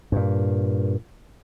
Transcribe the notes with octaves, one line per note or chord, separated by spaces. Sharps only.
G2 A#2